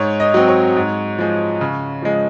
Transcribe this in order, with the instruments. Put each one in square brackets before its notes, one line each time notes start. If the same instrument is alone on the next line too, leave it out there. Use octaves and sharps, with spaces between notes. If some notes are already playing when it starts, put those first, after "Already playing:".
Already playing: [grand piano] G#2 C#5
D#5
F#3 C4
C#5
G#2
F3 G#3
C#3
F3 G#3